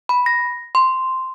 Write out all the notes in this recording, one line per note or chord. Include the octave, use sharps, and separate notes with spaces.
B5
A#6
C6